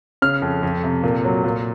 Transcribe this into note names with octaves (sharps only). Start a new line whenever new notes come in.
C#3 F6
F2
F2
C3
A#2
F#3
A#2